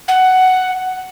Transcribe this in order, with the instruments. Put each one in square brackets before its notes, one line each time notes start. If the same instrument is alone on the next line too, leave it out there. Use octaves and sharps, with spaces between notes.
[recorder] F#5